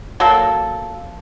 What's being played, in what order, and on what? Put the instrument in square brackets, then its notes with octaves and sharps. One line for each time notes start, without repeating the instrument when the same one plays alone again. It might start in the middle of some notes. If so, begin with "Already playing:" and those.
[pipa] F#3 A#3 A4